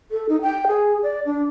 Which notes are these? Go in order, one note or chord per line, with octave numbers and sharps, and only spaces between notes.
A4
D#4
G5
G#4
D5
D4